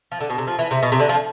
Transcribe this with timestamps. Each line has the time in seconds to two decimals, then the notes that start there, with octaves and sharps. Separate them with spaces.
0.12 F3
0.21 D3
0.30 B2
0.38 C3
0.47 F3
0.59 E3
0.71 C3
0.83 B2
0.92 C3
1.00 D3
1.09 F3